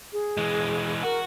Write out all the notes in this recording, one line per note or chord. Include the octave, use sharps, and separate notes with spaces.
G#4
E3 G#3
F#4 A#4